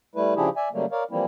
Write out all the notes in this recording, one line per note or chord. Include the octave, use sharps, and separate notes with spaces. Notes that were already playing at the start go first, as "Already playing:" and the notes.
G3 A3 E4 B4
C#3 F3 D4 E4 G4 G#4
D5 E5 G#5
C#3 F#3 G3 A3 A#3
A#4 C#5 D5 F5
E3 F3 G3 A#3 C4 E4